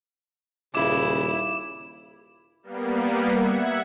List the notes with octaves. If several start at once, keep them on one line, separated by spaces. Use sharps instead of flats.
D#1 C#3 E4 D6 E7
G3 A#3 B3
E5 F#5 G#6 C#7